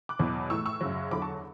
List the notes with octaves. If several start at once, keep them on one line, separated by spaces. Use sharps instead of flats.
D6 F#6
E2 B2 F#3
A2 E3 C#6 E6
C#6 E6
F#2 C#3 F#3
E2 D3 F#3 B5 D6
A5 C#6